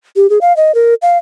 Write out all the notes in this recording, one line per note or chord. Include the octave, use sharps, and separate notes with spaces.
G4
G#4
F5
D#5
A#4
F5